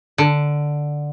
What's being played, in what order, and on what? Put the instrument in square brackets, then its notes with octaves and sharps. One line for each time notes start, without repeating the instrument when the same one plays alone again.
[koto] D3